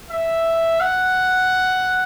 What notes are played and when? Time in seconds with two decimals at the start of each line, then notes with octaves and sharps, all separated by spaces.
0.10 E5
0.80 F#5